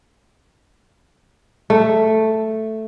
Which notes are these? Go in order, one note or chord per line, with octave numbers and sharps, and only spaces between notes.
A3